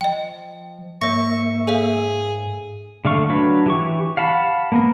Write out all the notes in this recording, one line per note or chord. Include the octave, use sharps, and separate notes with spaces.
F3 D#5 G5
G#2 A#3 C#5 E5 C#6 A#6
G#4 A4 C#5 F5
D3 A3 F5 C#6
F#3 D4 B4
E3 G4 C#6
F5 F#5 A5 B5
A#3 B3 A#4